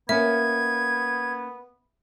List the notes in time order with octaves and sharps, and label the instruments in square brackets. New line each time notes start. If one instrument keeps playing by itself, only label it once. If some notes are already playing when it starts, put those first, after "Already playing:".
[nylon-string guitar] A#3 C#4 [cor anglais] B3 [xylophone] E5 [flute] G#6